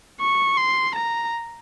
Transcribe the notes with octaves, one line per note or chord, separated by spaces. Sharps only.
C#6
C6
A#5